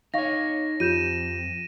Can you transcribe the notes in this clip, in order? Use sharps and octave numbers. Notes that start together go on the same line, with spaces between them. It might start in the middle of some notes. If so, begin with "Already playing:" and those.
D#4 C#5 D#5 F5 C#6 A#6
F2 F4 G4 G6 D#7 E7